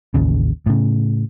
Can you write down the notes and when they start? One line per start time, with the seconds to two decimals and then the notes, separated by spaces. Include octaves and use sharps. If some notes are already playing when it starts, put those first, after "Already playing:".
0.14 A1 D#2 C#3
0.66 A2 C#3